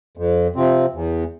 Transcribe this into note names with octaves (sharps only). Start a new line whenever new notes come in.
F2
C3 F3 C4
E2